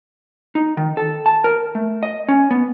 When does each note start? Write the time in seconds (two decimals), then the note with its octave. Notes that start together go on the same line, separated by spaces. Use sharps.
0.55 D#4
0.77 D#3
0.97 A4
1.26 A5
1.44 A#4
1.75 A3
2.03 D#5
2.28 C#4
2.51 B3